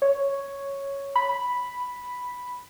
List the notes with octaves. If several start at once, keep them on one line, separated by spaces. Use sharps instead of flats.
C#5
B5